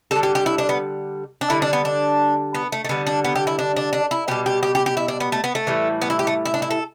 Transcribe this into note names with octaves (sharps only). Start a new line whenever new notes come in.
D3 G3 A4
G4
G4
E4
D4
B3
D4
D3 G3 E4
D4
B3
D4
B3
A3
A3
D3 G3 B3
D4
B3
G4
E4
D4
D4
D4
E4
B2 G3 G4
G4
G4
G4
G4
E4
D4
B3
A3
B3
A3
A2 E3 G3
B3
E4
G4
A3
E4
D4
E4
A4